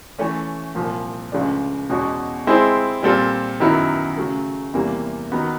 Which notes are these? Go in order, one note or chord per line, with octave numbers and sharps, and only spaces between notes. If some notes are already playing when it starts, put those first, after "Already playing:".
E3 A3 C#4
C2 A#2 F3
C#2 C#3 F3 A3 D4
E2 B2 G#3 C#4 F#4
G#3 C4 E4 G#4 C5
A#2 G3 C4 F4 A4
F#2 D#3 F#3 B3 E4
C#3 F#3 A3
E2 C3 E3 G3 A#3
D#3 F#3 B3